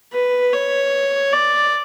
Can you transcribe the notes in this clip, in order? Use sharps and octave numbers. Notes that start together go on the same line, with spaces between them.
B4
C#5
D5